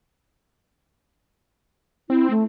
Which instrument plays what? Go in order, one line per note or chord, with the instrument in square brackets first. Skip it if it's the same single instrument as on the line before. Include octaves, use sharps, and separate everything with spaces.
[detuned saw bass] C4 [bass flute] E4
[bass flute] A3